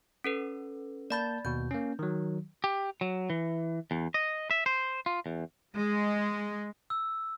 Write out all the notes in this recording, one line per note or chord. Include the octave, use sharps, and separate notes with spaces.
C#4 A4 B4
A#3 D5 A5 B5 G6 A6
D#2 B2 G6
A#3 C#4
D#3 F#3
G4
F#3
E3
E2
D#5
E5
C5
F4
E2
G#3
E6